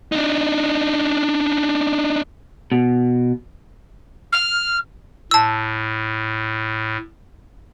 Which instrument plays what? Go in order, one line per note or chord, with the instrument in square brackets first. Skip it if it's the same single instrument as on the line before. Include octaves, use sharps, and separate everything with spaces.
[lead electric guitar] D4 D#4
[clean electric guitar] B2
[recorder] F6
[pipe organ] A2 [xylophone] A5 E6